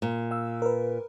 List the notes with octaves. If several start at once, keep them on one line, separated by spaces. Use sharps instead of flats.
A#2
F5 E6
A#4 B4